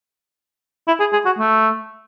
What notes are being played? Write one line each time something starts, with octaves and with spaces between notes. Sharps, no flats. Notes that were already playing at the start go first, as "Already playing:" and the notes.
E4
G#4
G#4
F#4
A3